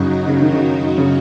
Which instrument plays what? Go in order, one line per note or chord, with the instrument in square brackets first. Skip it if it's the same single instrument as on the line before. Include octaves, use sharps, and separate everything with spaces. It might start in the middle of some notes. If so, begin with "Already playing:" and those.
Already playing: [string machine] F#2 F#3 D#4 F#4 [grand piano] C#3
[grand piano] C#3
D#3
C#3
C#3